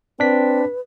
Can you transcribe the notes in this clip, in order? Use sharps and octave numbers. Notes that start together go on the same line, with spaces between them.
C4 D4 B4 B6